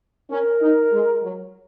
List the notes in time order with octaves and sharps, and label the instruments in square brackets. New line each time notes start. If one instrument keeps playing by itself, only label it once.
[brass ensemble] C#4 [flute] A#4
[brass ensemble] D#4
G#3
F#3